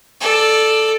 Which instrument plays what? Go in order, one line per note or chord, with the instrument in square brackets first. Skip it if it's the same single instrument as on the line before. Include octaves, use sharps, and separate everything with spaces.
[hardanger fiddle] A4 D5